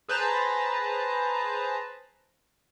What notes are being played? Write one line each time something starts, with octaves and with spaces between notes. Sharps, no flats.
G#4 B4 C5 A5 A#5